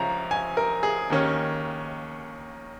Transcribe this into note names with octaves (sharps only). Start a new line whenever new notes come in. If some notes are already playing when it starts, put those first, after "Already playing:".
Already playing: C#2 C#3 F3 C#4 A#5
G#5
A#4
G#4
D#2 D#3 C#4